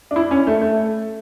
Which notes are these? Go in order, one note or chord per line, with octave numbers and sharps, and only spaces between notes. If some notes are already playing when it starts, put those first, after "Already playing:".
D4
E4
C#4
A3
A3